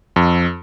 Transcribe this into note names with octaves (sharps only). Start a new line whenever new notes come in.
F2